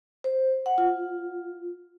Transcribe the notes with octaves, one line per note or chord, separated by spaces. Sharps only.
C5
F#5
F4